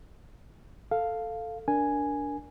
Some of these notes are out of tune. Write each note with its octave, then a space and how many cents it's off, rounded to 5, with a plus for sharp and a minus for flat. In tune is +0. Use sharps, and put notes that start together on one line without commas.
A4 +5 F5 +0
D4 -15 A#4 +0 G#5 +0